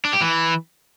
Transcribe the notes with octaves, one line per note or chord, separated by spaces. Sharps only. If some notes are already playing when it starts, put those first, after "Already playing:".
D4
G4
E3